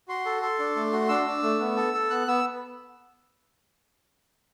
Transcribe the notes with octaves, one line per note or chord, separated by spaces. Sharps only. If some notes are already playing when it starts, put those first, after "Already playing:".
F#4 C6
A4
A4
D4
A3
F#4
D4 E6
D4
A3
B3
A4
A4
B3 F#6
B3 E6